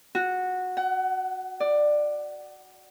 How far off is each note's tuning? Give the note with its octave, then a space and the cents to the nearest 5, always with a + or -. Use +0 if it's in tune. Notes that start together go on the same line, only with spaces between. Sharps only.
F#4 -10
F#5 +25
D5 +15